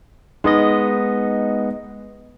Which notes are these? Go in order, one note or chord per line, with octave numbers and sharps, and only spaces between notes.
G#3 B3 D#4 D#5